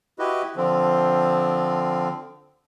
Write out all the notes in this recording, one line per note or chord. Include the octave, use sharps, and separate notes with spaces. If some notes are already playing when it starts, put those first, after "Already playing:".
E4 F#4 G4 B4 D#5
D3 F3 C4